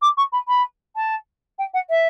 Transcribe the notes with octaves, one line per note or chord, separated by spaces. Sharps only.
D6
C#6
B5
B5
A5
G5
F#5
E5